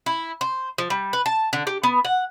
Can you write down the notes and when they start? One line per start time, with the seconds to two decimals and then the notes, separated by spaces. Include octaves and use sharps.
0.06 E4
0.41 C5
0.78 F3
0.90 G3
1.13 B4
1.26 A5
1.53 D3
1.67 G4
1.83 B3
2.05 F#5